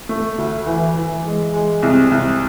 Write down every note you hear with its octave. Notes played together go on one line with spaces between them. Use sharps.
A3
D2
E3
E3
G#3
G#3
C2
C2